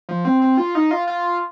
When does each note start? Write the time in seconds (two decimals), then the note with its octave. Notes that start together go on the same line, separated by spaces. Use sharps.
0.09 F3
0.25 C4
0.42 C4
0.57 F4
0.75 D#4
0.91 F4
1.07 F4